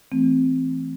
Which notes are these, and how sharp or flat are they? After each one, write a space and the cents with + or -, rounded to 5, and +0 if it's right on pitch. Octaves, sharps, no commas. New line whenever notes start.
E3 +0 A3 +0 C4 -5